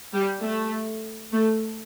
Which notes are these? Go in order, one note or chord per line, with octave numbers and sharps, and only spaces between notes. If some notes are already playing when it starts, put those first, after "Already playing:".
G3
A3
A3